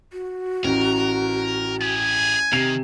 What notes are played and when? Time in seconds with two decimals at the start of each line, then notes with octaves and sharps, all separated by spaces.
0.13 F#4
0.64 A1 A#4
1.81 G4 G#4 G#5
2.52 C3 D#3 C7 F7